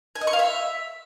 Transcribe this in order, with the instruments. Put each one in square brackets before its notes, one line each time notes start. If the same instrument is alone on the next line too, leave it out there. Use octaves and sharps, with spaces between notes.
[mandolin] G#5
D#5
C#6
F5
E5